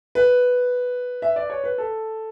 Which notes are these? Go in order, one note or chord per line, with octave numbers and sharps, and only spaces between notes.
B4
E5
D5
C#5
B4
A4